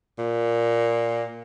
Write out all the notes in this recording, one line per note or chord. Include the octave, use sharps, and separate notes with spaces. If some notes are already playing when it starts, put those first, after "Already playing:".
A#2